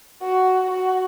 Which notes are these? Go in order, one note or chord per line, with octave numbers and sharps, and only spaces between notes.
F#4
F#4